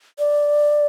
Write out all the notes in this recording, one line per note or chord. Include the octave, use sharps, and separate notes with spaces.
D5